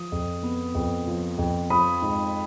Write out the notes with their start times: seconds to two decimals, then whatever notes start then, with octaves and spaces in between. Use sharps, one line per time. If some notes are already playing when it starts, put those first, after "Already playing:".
Already playing: F3 D#6
0.12 F2
0.43 B3
0.75 F2
1.07 F3
1.38 F2
1.70 F3 B5 D#6
2.02 G#2